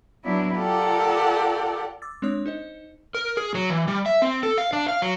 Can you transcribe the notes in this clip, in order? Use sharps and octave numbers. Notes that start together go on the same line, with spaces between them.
F#3 B3 D4 E4
F4 G4 A4 A#4 D5 F#5
D6 E6 A6
G#3 C4 D4 C#5 D#6 F#6
D#4 C5 D#5
A#4
G#4
F#3
E3
G3
E5
C4
A4
F5
D4
F5
F#3